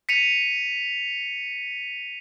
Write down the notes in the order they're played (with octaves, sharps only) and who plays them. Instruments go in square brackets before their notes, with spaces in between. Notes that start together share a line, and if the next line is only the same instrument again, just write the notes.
[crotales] B6 C#7 D#7 F7